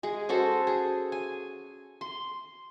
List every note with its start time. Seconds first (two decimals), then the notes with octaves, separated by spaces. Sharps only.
0.03 G#3 G#4
0.29 C#4 F#4 A4 C5
0.67 G#4
1.12 G#5
2.01 C6